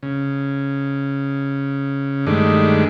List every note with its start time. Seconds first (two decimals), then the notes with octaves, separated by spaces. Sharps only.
0.03 C#3
2.27 G2 D#3 G#3 A3 D4